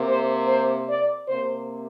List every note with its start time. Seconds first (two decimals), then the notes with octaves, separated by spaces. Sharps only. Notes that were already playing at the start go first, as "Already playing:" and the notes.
Already playing: C3 A#3
0.09 C5
0.48 C5
0.89 D5
1.28 C3 A#3 C5